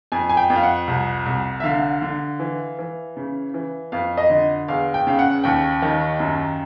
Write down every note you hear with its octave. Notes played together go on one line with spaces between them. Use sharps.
F2 G#5
G#5
G5
F2
F5
F#5
C2
C2
E5
D3 F5
D3
E3
E3
C#3
E3
F2 F5
D#5
D3
E2 F5
G5
C#3 F5
F#5
D#2 G5
D#3
F#2